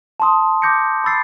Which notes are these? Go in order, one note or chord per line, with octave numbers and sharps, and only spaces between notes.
A5 C6 D#6
D6 G6 A#6 C#7
B5 E6 A6 C7